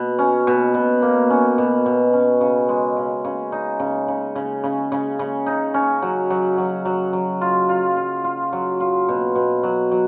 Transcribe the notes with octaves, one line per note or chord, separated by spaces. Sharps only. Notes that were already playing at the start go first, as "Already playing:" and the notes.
Already playing: B2
C#4
B2
B2
A#3
C#4
B2
B2
C#4
C#3
G#3
C#3
C#3
D#4
C#3
C#3
C#3
C#3
C#3
C#3
D#4
C#4
F#3
F#3
F#3
F#3
F#3
F4
F4
F4
F4
F#3
F4
B2
B2
F#3
F#3